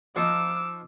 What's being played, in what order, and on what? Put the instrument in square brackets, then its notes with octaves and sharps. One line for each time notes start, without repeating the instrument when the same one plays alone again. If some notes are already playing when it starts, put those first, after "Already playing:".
[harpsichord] F3 D#4 [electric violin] D6 E6